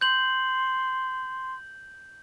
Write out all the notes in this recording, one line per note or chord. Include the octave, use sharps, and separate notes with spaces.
C6 G6 F#7